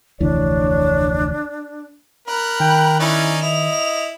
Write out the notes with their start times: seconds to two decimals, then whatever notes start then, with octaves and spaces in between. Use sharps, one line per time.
0.20 F1 D2 E3 D4 C#5
2.28 A#4 B5 F#6
2.60 D#3 G5
3.00 C#4 D#4 E4 D5
3.42 E4 D#5 F7